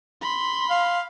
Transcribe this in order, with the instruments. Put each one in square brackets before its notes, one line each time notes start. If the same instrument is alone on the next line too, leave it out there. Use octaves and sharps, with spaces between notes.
[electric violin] B5 C6
[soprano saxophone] F5